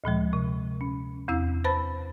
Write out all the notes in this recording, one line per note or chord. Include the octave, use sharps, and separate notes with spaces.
D2 A#2 F3 G#3
C3
C#4
E2 C4 E4 E6
B4 C5 A5 B5 F#6 A6